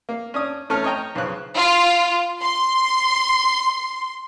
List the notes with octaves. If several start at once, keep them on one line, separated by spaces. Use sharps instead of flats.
A#3
C#4 D4 D#6
E2 A3 C#4 A4 F6
C#5 D#5 G5 A#5
B1 C#3 F3 F#6
F4
C6